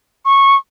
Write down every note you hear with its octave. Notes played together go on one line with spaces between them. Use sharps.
C#6